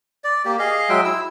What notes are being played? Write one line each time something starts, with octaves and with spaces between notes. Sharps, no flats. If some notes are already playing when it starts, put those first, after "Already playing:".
D5
A#3 G4
G#4 D#5 F5
F#3 G#3 E5 G5
E4 E6